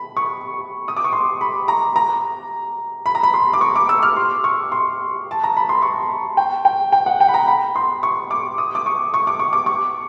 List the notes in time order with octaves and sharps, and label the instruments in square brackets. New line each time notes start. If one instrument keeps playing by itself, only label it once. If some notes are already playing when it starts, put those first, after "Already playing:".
Already playing: [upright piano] B5
C#6
D#6
D6
C#6
C6
B5
A#5
A#5
B5
A#5
B5
C6
D6
C#6
D6
E6
F6
C6
C#6
C6
A5
A#5
B5
C6
C#6
G5
G5
G5
F#5
G5
B5
A#5
B5
C6
C#6
D6
D#6
D6
C#6
C#6
D6
C#6
D6
C#6